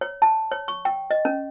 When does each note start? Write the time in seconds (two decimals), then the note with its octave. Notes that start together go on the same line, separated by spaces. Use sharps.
0.01 C#5
0.22 A5
0.52 C#5
0.68 C#6
0.85 G5
1.11 D#5
1.25 C#4